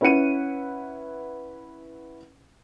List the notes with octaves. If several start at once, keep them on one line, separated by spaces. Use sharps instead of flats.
C#4 E4 B4 F#5 C#7 D#7